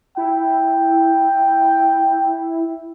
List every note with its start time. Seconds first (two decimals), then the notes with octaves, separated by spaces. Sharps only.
0.17 E4 G5